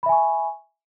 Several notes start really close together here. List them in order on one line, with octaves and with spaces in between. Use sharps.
B5 E5 G#5 C#6